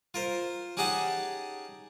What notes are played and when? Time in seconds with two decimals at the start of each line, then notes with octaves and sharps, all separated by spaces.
0.14 F4 A#4 C5
0.77 C#4 D#4 G4 G#4 F#5 A5